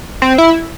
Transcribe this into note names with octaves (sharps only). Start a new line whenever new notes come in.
C4
E4